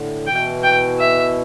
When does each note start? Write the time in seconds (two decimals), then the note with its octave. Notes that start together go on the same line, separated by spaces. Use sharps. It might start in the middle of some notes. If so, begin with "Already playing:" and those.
Already playing: A2 D3
0.26 B2 E3 G5
0.63 G5
1.00 E5